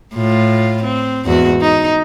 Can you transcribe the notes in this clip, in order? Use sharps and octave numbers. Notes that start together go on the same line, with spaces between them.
A2 F4
C4
E2 G#2 F#4
D#4